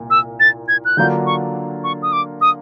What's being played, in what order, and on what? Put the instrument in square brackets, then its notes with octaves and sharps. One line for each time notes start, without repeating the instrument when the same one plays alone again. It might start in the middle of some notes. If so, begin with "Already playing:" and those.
Already playing: [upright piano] C2 A#2 A#3
[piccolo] E6
A6
G#6
F#6
[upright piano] D3 F#3 A#3 D4 F4 [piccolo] G6
[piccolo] C#6
C#6
D#6
D6
D#6